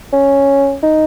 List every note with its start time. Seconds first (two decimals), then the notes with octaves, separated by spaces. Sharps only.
0.13 C#4
0.83 D#4